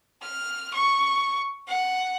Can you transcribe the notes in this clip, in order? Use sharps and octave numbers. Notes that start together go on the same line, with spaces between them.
F6
C#6
F#5